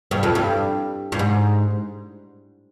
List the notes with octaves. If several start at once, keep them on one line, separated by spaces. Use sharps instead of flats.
G2
F2
G2
G2
G#2